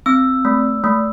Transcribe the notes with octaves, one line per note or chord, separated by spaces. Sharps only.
C4 E6
A3
A3